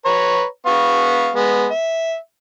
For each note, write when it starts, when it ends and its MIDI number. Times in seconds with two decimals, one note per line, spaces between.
0.05 0.45 71
0.05 0.45 73
0.05 0.45 82
0.66 1.31 59
0.66 1.31 77
0.66 1.31 85
1.36 1.67 56
1.36 1.67 59
1.70 2.16 76